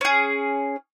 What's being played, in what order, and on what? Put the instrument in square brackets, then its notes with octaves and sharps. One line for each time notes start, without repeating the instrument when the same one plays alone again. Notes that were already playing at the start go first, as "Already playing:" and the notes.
[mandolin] C#4 G#4